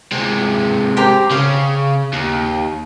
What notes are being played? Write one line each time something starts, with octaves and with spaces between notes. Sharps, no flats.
C3 G#3
G4 C5 A#5
C#3 F5
D#2